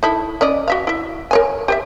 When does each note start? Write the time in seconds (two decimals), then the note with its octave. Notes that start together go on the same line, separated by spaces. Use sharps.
0.03 D#4 E4 A4
0.41 C#4 D5 D#5
0.68 F#4 E5 F5
0.87 E4 E5
1.31 A#4 C#5 G#5
1.68 G4 C5 E5